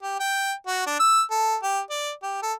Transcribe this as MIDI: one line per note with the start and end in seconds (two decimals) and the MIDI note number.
0.03 0.16 67
0.20 0.52 79
0.67 0.86 66
0.86 0.95 62
1.00 1.22 88
1.31 1.56 69
1.63 1.80 67
1.90 2.12 74
2.23 2.39 67
2.43 2.53 69